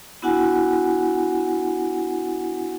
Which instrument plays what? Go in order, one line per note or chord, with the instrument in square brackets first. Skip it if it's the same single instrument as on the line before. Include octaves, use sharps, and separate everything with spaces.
[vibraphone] B3 D4 E4 F#4 F#5 G#5